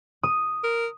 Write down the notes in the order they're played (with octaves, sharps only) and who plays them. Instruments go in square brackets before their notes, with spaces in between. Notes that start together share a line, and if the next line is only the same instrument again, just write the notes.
[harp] D#6
[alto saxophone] A#4